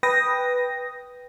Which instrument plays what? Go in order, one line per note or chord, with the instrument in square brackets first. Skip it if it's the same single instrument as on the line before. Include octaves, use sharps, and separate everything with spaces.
[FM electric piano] B4 G5 D#6 A#6